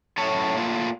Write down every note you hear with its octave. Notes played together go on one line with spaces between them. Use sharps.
F#2 E4 A4 C#5 A5
A3 A#3 D4 F4